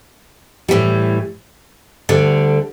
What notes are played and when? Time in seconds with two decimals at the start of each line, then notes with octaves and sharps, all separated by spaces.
0.68 A2 E3 G3
2.09 D2 D3 G3